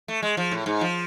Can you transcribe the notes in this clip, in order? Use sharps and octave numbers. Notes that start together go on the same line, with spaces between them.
A3
G#3
F3
A2
G#2
F3